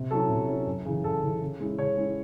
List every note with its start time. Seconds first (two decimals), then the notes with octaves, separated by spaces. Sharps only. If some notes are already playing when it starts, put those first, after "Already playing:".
Already playing: C3
0.11 F#3 C#4 E4 A4
0.30 C3
0.48 F#3 C#4 E4
0.67 F#2
0.86 C#3 E3
1.04 F#2 A4
1.23 C#3 E3
1.42 C#3
1.60 G#3 C#4 E4
1.78 C#3 C#5
1.97 G#3 C#4 E4